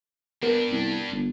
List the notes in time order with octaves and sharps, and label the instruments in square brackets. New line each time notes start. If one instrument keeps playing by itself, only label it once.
[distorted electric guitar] G2 D4 [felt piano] B3 A#4
[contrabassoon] C2
G1